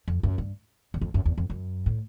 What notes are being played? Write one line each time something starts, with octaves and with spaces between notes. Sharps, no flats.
F2
F#2
G2
E2
F2
F#2
E2
F2
F#2
A2